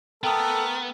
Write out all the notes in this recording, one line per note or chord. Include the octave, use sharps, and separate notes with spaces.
A3 B3 A4 A#4 G5 D#6